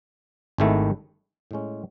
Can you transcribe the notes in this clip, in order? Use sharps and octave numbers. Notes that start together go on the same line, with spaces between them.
G#1 G#2 D#3 A3 E4
A2 G#3 C#4